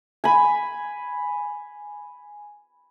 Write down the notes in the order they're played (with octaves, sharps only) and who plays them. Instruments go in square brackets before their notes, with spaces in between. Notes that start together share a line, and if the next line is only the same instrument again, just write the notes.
[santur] G#5 B5